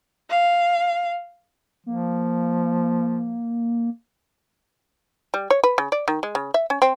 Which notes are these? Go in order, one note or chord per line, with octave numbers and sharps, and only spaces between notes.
F5
F3 A#3
G3
C#5
B4
C#3
D5
D#3
G#3
C#3
E5
C#4
C4